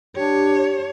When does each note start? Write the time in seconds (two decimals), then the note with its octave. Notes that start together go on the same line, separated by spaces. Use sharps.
0.16 D4 G4 C#5